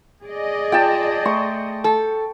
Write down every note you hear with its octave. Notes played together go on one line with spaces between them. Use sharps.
G#4 D5 D#5
F4 G5 A5
A3 C6 C#6
A4